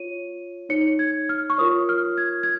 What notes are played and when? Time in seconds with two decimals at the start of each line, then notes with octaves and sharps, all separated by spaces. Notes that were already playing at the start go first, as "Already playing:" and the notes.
Already playing: F4 C#5 D#7
0.69 D#4 C#5 C#7
0.99 G#6
1.29 F6
1.50 C#6
1.58 F4 A#4 C#5 D#6
1.89 F6
2.18 G#6
2.43 G#6